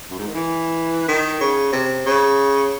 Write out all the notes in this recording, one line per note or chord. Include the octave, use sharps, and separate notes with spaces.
F#2
G#2
D#3
E3
D#3
C#3
C3
C#3